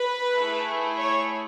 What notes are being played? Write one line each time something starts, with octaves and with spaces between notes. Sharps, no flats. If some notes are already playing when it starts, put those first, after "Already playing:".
Already playing: B4
A3 E4 G#4
C#5